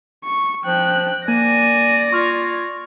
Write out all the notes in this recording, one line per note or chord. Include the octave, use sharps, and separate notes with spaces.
C#6
F3 G5 F#6
A#3 D5 G#5 A#6
F4 C#6 F6 G#6